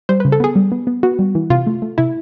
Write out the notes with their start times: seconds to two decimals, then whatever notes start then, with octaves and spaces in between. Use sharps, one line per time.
0.09 G3 C5
0.20 C#3 B4
0.32 A4
0.40 B3 G#4
0.56 G3
0.72 B3
0.87 B3
1.03 B3 F#4
1.19 G3
1.35 E3
1.50 C3 F4
1.67 A3
1.82 A3
1.98 C3 E4